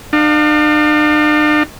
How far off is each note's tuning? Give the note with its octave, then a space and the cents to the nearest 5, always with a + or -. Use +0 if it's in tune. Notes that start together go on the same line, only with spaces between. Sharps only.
D4 +45 F5 +20